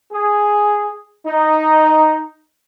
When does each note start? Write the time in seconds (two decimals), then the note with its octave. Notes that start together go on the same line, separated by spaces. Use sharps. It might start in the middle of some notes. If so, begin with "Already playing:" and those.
0.13 G#4
1.26 D#4